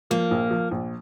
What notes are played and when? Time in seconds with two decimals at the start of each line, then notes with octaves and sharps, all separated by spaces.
0.11 F3 A#3
0.31 A#1
0.50 F3
0.71 A#1